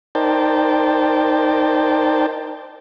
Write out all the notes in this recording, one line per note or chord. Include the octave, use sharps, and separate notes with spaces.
D#4 A#4 C5 D5 G5 A5